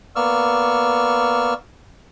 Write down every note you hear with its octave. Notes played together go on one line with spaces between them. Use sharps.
A#3 B3 D5 C#6 E6 F6